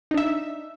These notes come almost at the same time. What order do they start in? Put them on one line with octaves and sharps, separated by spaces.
D#4 D4 E5